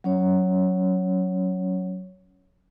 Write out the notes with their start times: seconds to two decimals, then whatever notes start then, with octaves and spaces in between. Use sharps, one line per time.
0.04 F#3 C#4 C#5